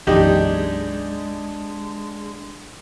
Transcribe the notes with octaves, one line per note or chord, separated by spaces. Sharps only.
B1 F#2 E3 G#3 D4 D#4 G4